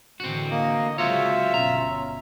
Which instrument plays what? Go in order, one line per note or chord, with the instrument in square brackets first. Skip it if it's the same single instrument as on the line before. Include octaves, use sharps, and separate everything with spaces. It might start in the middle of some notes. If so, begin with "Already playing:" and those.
[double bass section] A2 D3 E3 [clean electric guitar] C4 F#4
[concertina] A#3 [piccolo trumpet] D#5
[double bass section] C#3 F#3 G#3 [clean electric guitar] C4 F#4 C#5 [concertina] F4 [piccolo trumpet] E5
[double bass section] G1 B2 C#4 [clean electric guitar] A#5